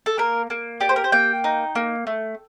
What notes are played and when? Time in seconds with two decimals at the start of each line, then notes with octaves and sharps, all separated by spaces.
0.06 A4
0.18 A#3 A#4
0.50 A#3
0.80 G4 D5
0.89 C5
0.96 A#4
1.04 C5
1.12 A#3 G5
1.44 D#4
1.75 A#3
2.07 A3